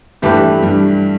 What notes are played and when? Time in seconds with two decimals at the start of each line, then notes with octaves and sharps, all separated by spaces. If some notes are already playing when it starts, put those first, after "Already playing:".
0.22 G2 E3 G3 A3 G4 B4
0.62 G2 G3